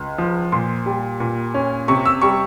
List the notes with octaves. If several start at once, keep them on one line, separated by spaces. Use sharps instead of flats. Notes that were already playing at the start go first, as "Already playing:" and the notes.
Already playing: C#2
F3
A#2 C6
G3
A#2
C#4
C3 C#6
E6
G3 C#6